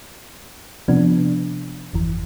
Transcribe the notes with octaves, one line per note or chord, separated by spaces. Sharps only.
C3 F3 B3 D4
G1 F2 E3